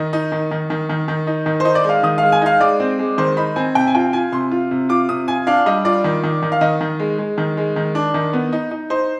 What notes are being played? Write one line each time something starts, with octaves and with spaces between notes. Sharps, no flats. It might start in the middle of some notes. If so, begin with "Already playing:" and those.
Already playing: D#3 D#5
D#4
D#3
D#3
D#3
D#3
D#3
D#4
D#3
D#4 C5
D5
G#3 F5
D#3 D#6
G#3 F5
G#5
D#4 F5
G#3 D5
C4
G#3
D#3 C5
D#4 B5
C4 G#5
C3 G5
G#5
F4 G5
F4 G#5
C3 C6
F4
C3
F4 D6
C3 D#6
F4 G#5
D4 F5
G3 D#5
F4 D5
D#3
D#3
D#3
F5
D#3 D#5
D#3
G#3
G#3
D#3
G#3
D#3
D4
D#3
B3
D#4
D#4
D#4 C5